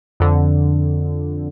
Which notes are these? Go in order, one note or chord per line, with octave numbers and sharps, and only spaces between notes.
F2 D3